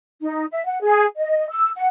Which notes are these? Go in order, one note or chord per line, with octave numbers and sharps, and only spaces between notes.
D#4
E5
F#5
G#4
D#5
E6
F#5